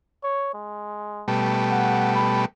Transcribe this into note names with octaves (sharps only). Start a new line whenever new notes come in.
C#5
G#3
B2 G3 A3
F#5
B5